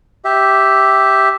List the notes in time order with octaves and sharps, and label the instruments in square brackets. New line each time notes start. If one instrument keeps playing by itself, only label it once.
[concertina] G4 E5